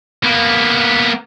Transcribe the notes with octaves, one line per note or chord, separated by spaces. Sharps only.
A#3 B3